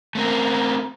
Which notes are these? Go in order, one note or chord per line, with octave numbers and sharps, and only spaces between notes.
A3 C4 A#4